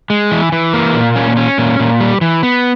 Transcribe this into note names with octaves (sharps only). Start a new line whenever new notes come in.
G#3
E3
E3
A#3
A#2
C#4
C#4
A#2
A#2
G3
E3
B3